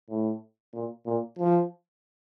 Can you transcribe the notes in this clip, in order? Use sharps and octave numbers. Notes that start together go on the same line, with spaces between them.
A2
A#2
A#2
F3